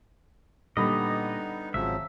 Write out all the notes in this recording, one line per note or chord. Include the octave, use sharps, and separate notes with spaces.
A#2 D3 G3 B3 D#4 D#5 B5
G#1 C#3 F3 F#3 E5